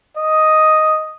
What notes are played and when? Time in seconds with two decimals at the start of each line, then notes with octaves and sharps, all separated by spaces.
0.17 D#5